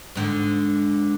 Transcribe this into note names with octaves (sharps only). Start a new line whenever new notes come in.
G#2 D3